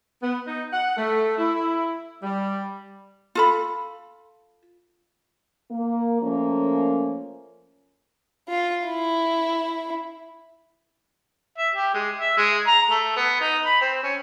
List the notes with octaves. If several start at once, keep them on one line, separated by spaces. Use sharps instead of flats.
B3
D#4
F#5
A3
E4
G3
F4 A4 B5
A#3
F3 A3 A#3 C#4
F4
E4
E5
G4
G#3
E5
G#3
A#5
A3
B3
D#4
B5
C4
C#4